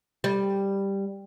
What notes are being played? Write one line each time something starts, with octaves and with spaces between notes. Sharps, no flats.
G3